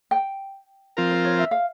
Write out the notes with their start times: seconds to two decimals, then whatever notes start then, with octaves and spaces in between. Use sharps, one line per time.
0.11 G5
0.97 F3 C4 F4 A#4
1.11 C5
1.24 C#5
1.38 E5
1.51 F5